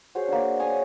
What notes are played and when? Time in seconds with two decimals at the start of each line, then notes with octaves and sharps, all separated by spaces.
0.15 F#4 G#4 C5 C#5
0.28 A#3 D4
0.59 C#5 G#5 D#6